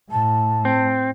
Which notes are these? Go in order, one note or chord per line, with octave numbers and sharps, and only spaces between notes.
A2 A5
C4